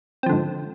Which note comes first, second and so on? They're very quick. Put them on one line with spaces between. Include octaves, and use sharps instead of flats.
C4 F3 D3 G#2